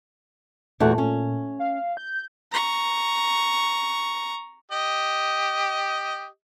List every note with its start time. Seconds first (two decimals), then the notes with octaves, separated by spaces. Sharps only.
0.80 E2 A#2 A3 F#4
0.98 C#4
1.59 F5
1.97 G6
2.52 A#5 C#6
4.72 G4 D#5